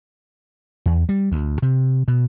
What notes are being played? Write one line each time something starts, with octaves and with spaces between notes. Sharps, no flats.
E2
G3
D2
C3
B2